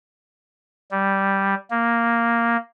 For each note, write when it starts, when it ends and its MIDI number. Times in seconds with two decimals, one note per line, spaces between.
0.91 1.55 55
1.71 2.57 58